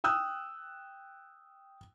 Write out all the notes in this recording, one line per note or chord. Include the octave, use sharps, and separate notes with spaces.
G5 D#6 E6 F#6